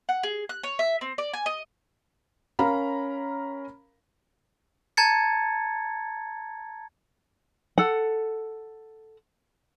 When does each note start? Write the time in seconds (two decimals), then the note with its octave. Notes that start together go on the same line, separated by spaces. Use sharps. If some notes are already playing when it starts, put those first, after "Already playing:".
0.09 F#5
0.23 G#4
0.49 F#6
0.63 C#5
0.79 E5
1.01 C4
1.18 D5
1.34 G#5
1.46 D#5
2.59 C#4 A#4 F5 A#5 B5
4.97 A5 A#5 G#6 A6 C#7
7.78 A4 F#5